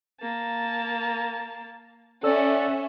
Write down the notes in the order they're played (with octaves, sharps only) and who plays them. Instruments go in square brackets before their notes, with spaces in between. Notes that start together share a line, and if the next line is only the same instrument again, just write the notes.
[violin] A#3 A5
[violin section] C#4 E5 [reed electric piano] A4 E6 [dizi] D5 [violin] F#5